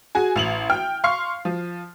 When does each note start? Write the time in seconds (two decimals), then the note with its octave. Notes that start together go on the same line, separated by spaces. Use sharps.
0.15 F#4 G#4 G#5
0.36 A1 F7 F#7
0.70 G5 F6
1.04 F5 C6 C#6 F6 C7
1.45 F3